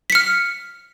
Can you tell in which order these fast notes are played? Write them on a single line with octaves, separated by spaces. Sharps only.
B6 C#7 F6